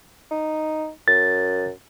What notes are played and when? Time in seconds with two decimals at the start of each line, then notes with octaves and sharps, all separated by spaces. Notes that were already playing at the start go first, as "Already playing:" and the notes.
0.31 D#4
1.08 F#2 A6